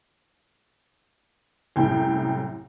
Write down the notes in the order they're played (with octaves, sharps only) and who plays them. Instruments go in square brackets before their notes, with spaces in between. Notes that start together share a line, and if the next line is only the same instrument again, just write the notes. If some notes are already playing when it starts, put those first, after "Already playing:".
[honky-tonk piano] C2 F#2 A2 G5